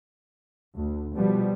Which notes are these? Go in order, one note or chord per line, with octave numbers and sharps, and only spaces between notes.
D2
B2 F3 G3 B3